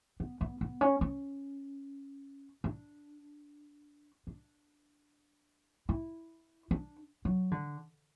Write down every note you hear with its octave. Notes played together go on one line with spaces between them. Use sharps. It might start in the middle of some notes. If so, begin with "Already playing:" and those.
B3
B3
B3
C#4
C#4
D4
D4
E4
D4
F#3
D3